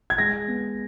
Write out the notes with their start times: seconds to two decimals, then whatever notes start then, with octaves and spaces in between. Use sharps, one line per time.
0.10 G#6
0.18 G#3 A#6
0.48 B3